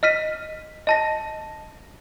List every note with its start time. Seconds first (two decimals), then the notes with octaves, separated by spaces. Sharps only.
0.03 D#5 F6 B6 D#7
0.87 D#5 A5 A#6